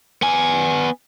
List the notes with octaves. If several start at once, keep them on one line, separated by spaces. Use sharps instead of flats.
B3 G#5